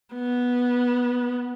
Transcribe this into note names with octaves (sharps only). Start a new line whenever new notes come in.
B3